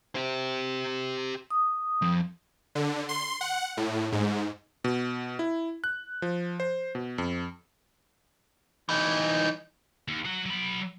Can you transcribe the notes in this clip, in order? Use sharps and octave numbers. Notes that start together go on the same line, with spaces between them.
G4 C5
D#6
F2
D3
C6
F#5
A2
G#2
B2
E4
F#6
F3
C5
B2
F2
E3 D#4
D#2
F#3 F#5
F#3 B5